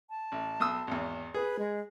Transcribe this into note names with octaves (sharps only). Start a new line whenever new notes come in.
A5
A1
B1 D#6 E6
G#1 E2
G#4 B4
G#3